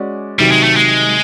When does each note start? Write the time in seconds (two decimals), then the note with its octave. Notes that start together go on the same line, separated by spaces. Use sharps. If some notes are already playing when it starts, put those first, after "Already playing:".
Already playing: G#3 C#4 F#4 D5
0.39 C3 D#3 F#3 G3
0.52 G#3
0.64 A3
0.77 G#3